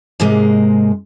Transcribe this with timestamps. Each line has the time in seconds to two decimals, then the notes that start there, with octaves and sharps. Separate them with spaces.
0.20 G#2 C3 G#3 A#3